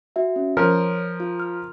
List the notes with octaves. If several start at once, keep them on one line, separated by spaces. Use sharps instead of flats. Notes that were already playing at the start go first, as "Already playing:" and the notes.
F#4 E5
C#4
F3 A#4 C#5
F4
F6